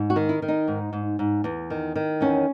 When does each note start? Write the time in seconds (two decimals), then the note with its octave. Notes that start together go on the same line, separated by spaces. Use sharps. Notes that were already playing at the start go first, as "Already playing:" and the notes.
Already playing: G#2
0.10 F#4
0.16 D#3
0.29 E4
0.42 D#3
0.48 D#4
0.68 G#2
0.93 G#2
1.19 G#2
1.44 E2
1.70 D#3
1.96 D#3
2.21 E2 C#4